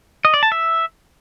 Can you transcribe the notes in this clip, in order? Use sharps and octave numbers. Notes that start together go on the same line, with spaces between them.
D#5
D5
A5
E5